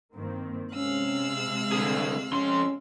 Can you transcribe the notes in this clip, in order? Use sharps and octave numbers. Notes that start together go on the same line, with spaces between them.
G2 D#3 A#3 C4
C3 G#3 C#4 F5 E6 F#6
C2 D3 G#4
F2 C#4 C6